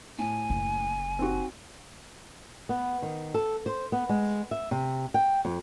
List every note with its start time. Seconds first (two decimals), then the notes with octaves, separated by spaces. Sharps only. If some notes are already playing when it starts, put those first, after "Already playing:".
0.19 A2 G#5
0.50 F#1
1.19 C4 D#4 F#4
2.69 B3
3.02 D#3
3.34 A4
3.66 C5
3.92 B3
4.09 G#3
4.51 E5
4.71 C3
5.14 G5
5.45 F2